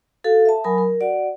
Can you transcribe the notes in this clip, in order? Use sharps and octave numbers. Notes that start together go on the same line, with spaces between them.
F#4 A4 F5
E5 A5
F#3 A#4 G#5 B5 D#6
A#4
F#4 D5 F#5